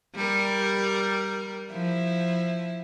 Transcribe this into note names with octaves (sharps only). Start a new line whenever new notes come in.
G3 A#4
F3 E4